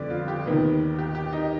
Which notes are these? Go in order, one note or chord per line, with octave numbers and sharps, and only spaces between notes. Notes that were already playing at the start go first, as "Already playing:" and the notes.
Already playing: F2 D3 G3 B3 D5
F4
G4
D#2 D#3 B3
G4
G4
D#4